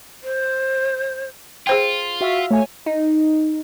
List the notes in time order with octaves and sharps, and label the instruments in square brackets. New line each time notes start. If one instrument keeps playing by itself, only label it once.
[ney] C5
[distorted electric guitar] F4 [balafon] G#4 C5 G5
[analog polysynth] F#4 E5 F5
[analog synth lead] A3 [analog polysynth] C#5 G#5
[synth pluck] D#4